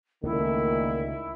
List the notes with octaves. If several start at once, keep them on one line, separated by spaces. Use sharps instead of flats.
C#2 A#2 D3 D#3 A3 E4